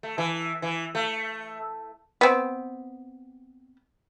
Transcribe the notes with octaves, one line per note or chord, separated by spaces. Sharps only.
A3
E3
E3
A3
B3 C4